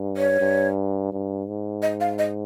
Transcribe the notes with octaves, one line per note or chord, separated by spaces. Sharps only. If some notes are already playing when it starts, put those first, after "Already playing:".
Already playing: G2
C#5
G2
G2
G#2
D#5
F5
D#5